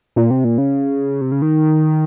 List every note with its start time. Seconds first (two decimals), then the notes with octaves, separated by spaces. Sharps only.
0.16 A#2
0.31 C3
0.44 A#2
0.58 C#3
1.21 C3
1.32 C#3
1.42 D#3